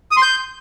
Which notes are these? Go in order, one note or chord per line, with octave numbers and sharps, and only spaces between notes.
D#6
C6
G6